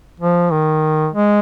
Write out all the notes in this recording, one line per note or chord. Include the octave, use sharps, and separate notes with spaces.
F3
D#3
G#3